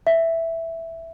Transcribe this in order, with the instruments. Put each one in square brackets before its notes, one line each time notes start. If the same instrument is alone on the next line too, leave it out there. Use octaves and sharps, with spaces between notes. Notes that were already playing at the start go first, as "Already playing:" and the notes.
[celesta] E5